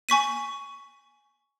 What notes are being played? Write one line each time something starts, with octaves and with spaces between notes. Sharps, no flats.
G#5 C#6 B6 D#7